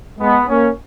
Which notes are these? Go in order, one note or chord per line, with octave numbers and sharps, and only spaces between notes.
G#3 B3
A#3 C#4